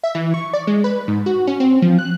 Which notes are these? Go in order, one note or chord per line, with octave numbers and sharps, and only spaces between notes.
E5
E3
C#6
D5
G#3
B4
G#2
F#4
C#4
C4
F3
F#6